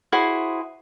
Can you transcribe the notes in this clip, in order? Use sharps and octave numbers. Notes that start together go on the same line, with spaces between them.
E4 F#4 G#4 C5